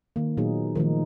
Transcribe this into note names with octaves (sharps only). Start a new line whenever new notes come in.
D#3 A#3
A#2 F#3 B3 D#4 G#4
D#3 F3 A3 D#4